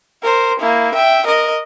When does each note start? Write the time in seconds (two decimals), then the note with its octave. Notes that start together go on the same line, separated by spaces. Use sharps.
0.23 A#4 C5
0.60 A#3 E4
0.95 E5 G5
1.26 A#4 D#5